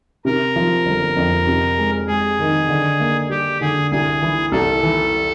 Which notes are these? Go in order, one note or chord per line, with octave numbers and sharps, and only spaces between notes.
C3 A#4
F3
G1
F2
C3
G#3
G#3 G#4
D#3
D3
A#3
G3 G4
D3 G#4
C2 G#4
E3
C2 A4
E3